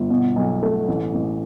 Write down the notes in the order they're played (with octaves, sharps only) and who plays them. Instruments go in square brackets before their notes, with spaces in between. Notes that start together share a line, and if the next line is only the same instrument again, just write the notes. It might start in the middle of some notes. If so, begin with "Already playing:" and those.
Already playing: [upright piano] G1
B2
B1
A3
A1
A1